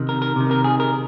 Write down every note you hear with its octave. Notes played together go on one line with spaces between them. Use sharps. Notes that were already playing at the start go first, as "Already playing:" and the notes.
Already playing: C3 D#3
A#4
A#4
C3 D#3
A#4
G#4
A#4